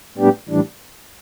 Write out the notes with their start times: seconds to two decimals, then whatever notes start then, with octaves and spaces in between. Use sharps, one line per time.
0.18 A2 G3 B3 D4 G4
0.49 A2 E3 G3 D4